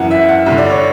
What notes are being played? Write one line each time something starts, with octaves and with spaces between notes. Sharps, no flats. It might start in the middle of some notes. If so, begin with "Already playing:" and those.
Already playing: F#2 E3 F#5
E5
F#5
G2 D3 E5
D5
C#5